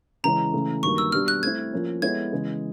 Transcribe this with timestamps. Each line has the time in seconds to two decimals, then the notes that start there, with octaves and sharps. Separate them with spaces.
0.24 C#3 E3 G#3 C#4 A#5
0.53 C#3 E3 A3
0.83 G2 D#3 F#3 A#3 C#6
0.98 E6
1.12 B2 G3 B3 D4 G4 F6
1.28 F#6
1.43 A3 C4 E4 G#6
1.73 F3 A#3 C#4
2.02 G#3 B3 E4 A4 C#5 G#6
2.32 C#3 E3 G#3